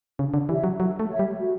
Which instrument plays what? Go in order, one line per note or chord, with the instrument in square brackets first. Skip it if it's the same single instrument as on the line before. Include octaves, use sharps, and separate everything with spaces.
[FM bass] C#3 [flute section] D4
[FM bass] D3
[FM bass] E3 [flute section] G4 C#5 E5
[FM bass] F#3
[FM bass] F#3 [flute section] A4
[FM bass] A3
[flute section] C#5 E5
[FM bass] G3
[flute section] F#4